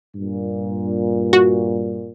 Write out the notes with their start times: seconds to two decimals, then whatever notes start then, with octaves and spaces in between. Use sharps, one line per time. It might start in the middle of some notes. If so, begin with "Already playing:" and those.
0.15 G2 A#2
1.33 F#4